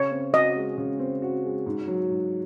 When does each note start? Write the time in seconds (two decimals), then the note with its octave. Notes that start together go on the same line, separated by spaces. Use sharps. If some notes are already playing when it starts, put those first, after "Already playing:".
Already playing: C#3 C#5
0.11 C4
0.33 F#4 D#5
0.56 G#3
0.78 C#3
0.99 C4
1.22 F#4
1.44 G#3
1.66 G#2
1.87 F#3
2.10 G#2